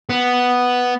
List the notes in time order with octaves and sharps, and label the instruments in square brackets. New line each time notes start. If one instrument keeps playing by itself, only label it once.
[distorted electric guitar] B3